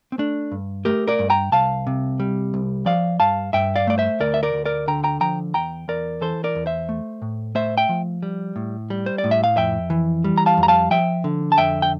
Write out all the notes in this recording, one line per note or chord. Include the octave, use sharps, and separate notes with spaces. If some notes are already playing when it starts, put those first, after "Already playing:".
C4
A3 D4
G2
A3 G4 A#4
A#4 D5
G2
G5 A#5
C2 F5 A5
C3
G3
C2
F3 D5 F5
G2 F5 A5
G2 E5 G5
D5 F5
A3 D5
C5 E5
D2 A#4 D5
E5
A#4 D5
D2
A#4 D5
D3 G5 A#5
G5 A#5
F3 G5 A#5
E2 G5 A#5
E2 A#4 D5
E3 A4 C5
A#4 D5
E2
C5 E5
A3
A2
A3 C5 E5
E5 G5
F3
G3
A2
G3
C5
D5
A2
E5
F5
F2 E5 G5
E3
G3
A#5
F5 A5
F2
A#5
F5 A5
F3 E5 G5
D3
A5
F2 E5 G5
G5